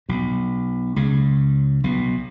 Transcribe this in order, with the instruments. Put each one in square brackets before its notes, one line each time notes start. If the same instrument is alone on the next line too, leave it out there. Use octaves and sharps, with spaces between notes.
[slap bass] B1 B2
C#2 C#3
B1 B2